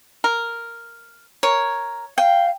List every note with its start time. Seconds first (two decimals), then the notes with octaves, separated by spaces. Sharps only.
0.24 A#4
1.43 A#4 C#5
2.18 F5 G5